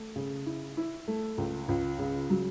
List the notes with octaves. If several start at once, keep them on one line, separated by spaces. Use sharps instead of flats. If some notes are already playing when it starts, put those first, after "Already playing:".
Already playing: A3
C#3
E4
E4
A3
C#2
C#2
C#3
F#3